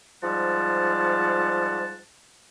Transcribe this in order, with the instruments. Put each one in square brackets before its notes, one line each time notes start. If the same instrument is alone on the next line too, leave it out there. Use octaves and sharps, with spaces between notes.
[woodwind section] G#2 F3 G3 F#5 A5